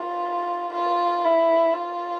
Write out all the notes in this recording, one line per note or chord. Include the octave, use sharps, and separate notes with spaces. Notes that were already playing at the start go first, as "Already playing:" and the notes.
Already playing: F4
F4
E4
F4